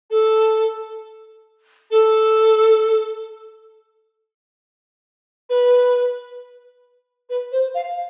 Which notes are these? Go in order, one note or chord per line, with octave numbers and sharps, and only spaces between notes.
A4
A4
B4
B4
C5
F5